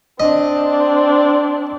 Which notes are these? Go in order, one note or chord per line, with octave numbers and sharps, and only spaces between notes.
C4 D4 D#5